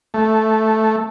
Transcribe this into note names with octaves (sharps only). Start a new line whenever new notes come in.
A3